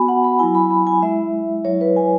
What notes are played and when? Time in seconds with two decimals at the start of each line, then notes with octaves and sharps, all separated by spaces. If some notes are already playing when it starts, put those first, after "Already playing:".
Already playing: B3 F#4 G#5 B5
0.08 F#5
0.24 B5
0.39 F#3 E4 G#5
0.55 B5
0.71 B5
0.87 G#5
1.02 G#3 E4 E5
1.65 F#3 E4 C#5
1.81 B4
1.96 G#5